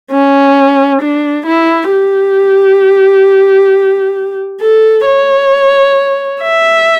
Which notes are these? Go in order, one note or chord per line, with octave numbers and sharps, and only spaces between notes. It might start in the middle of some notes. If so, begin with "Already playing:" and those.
C#4
D4
E4
G4
A4
C#5
E5